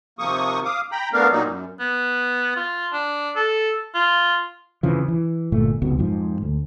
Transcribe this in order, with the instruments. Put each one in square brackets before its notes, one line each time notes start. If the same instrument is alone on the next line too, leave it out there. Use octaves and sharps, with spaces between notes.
[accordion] D#2 C3 F3 A#3 C#6 D#6
F5 D6 D#6
G5 A#5 B5
A3 B3 D4 A#4 F5
A#2 F#3 G3 A#3 D#4
F#2
[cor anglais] B3
F4
D4
A4
F4
[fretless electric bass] F2 C#3 E3 F3
E3
G1 A#2 A3
F1 C#2 B2
F2 G#2 F3
D2